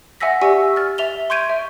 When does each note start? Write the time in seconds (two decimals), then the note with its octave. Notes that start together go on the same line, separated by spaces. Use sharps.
0.20 E5 F#5 G#5 E6 A#6 B6
0.41 G4 D5 G#5 C#6 E6
0.76 F6 A6
0.98 E5 F7 G7
1.30 C6 C#6 G6 G#6 D7 D#7
1.50 E5